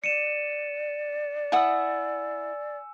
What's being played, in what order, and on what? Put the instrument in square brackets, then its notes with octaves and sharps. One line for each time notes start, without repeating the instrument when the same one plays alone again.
[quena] D5 [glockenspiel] C#7 D#7 E7
[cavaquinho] E4 F#5 D#6 [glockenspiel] G#5 E6